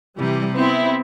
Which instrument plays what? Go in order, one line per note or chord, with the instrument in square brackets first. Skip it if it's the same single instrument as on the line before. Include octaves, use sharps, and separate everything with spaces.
[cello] C3 E3 [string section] G3
[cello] B3 [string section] C4 E4